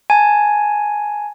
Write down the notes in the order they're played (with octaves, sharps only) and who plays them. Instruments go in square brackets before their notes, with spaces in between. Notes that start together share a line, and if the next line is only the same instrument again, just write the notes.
[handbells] G#5 A5